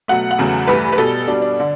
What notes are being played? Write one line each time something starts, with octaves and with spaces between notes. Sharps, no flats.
B2 F#3 A3 F#5
F#5
E2 C#3 F#3 A3
G2 E3 A3 B4
B4
B2 G3 A4
B2 G3 D4
D4
D3